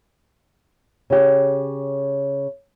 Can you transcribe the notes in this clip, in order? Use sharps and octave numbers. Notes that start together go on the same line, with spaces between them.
C#3 G4